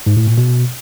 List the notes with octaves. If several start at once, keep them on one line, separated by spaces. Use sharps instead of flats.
G#2
A2
A#2
B2